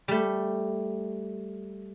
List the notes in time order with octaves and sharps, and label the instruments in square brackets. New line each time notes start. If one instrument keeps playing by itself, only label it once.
[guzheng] G3 A3